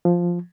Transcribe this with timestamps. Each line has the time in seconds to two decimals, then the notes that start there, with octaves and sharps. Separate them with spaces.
0.05 F3